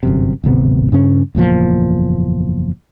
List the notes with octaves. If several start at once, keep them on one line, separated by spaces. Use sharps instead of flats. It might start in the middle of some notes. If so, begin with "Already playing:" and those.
G1 F#2 C3
D1 G#1 C3 B3
G2 C#3 C#4
F#1 E2 A#2 F3